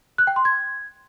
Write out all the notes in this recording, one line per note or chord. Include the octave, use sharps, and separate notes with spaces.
F#6
G5
C6
G#6